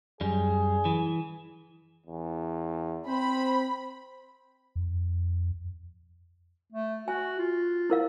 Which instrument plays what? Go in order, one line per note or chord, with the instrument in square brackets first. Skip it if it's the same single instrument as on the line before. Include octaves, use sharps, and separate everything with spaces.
[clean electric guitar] F#2 G3 [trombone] G#4
[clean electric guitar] E3
[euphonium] E2
[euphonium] C4 [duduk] C5 [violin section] B5
[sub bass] F2
[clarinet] A3
[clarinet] F#4 [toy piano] G#5
[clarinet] F4
[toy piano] E4 A#4 F5